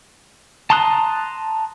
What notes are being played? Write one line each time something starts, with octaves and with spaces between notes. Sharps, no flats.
A5 A#5 C6 D#6 F#6